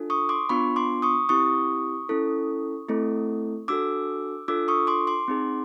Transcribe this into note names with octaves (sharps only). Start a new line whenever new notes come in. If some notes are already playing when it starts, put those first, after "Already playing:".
Already playing: D4 F4 A4
C#6 D#6
C6 D6
B3 D4 F4 B5 C#6
C6 D6
C#6 D#6
C4 E4 G4 C#6 D#6
C#4 E4 A4
A3 C4 E4 A4
D4 F#4 A4 D6 E6
D4 F4 A4 D6 E6
C#6 D#6
C6 D6
C6 D6
C4 D#4 G#4